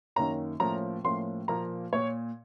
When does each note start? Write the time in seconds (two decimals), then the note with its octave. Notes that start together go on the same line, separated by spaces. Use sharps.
0.16 F#2 D#3 A#3 C#4 A#5
0.60 A2 F3 A#3 C#4 A#5
1.04 A2 F3 A#3 C#4 C6
1.48 A#2 F3 A#3 A#5
1.93 A#2 C#5